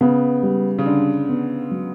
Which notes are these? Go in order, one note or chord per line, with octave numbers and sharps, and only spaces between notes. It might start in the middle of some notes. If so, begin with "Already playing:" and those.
C#3 B3
G3
C#3
D3 D4
B3
F#3